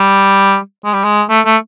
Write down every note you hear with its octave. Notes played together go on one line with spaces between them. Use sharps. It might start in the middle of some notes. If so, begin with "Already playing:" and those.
Already playing: G3
G#3
G3
G#3
A3
A3